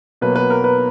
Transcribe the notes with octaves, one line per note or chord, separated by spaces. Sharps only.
B2 F#3 A#3 B4
B4
A#4
B4